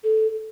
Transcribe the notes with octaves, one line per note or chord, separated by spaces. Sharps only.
A4